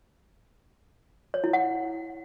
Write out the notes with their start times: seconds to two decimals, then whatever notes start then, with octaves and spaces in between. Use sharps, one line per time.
1.34 C#5
1.44 E4
1.53 F#5